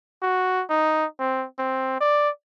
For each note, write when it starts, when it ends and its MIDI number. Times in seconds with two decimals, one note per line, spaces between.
0.22 0.64 66
0.70 1.05 63
1.19 1.46 60
1.59 1.96 60
2.01 2.30 74